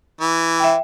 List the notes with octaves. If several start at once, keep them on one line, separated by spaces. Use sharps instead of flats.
E3
E5 G5